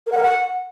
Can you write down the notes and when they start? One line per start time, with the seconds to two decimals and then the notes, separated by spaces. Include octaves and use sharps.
0.06 A#4
0.12 F#5
0.17 A#4
0.22 F#5